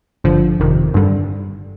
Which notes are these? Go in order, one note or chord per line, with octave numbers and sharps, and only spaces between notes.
G#1 G2 D3 F3
G1 F2 C3 D#3
G2 D3 G3